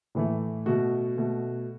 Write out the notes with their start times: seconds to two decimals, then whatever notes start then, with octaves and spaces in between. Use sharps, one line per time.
0.15 A2 E3 A3
0.66 B2 A3 F#4
1.17 B2 A3